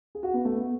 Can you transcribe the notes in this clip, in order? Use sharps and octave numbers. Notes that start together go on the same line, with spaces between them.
G#4
F#4
B3
A3
B3